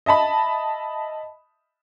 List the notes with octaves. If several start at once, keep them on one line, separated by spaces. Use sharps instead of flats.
D#5 E5 A5 B5